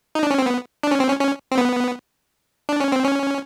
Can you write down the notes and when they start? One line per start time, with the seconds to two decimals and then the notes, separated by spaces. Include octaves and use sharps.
0.15 D#4
0.23 D4
0.31 C#4
0.38 C4
0.46 B3
0.83 D4
0.91 C#4
1.00 C4
1.09 C#4
1.20 C#4
1.52 C4
1.58 B3
2.69 D4
2.80 C#4
2.92 C4
3.04 C#4